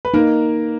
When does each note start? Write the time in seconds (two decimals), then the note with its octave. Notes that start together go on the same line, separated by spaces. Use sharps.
0.05 B4
0.14 A#3 D#4 A#4